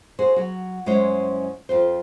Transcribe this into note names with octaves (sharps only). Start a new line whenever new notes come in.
F#4 G#4 C5
F#3 F#4
F#2 G#3 C#4 E4 C5 C#5
F2 F4 C5